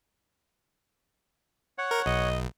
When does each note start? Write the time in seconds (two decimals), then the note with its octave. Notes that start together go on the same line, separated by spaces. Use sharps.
1.78 C#5 F#5
1.91 A#4
2.06 B1 D#5